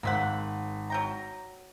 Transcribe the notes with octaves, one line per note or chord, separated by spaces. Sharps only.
G#1 A#3 C4 F#5 B6
F#3 G5 A#5